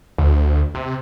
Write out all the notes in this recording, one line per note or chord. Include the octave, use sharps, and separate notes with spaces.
D2
C3